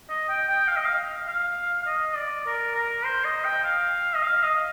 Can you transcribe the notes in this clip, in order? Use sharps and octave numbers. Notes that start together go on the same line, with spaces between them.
D#5
G5
G5
F5
D#5
F5
F5
F5
D#5
D5
A#4
A#4
C5
D#5
G5
F5
D#5
F5
D#5